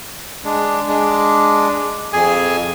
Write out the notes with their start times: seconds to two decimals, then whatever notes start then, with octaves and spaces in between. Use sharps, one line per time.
0.45 G#3 D4
0.87 G#3 D4
2.13 F2 G#4 G#5